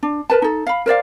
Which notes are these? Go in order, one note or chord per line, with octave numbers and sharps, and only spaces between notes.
D4
A#4 B4 A5
D#4 A4
F5 B5
A#4 C5 D5 F5